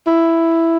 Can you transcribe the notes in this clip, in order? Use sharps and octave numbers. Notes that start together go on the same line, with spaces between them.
E4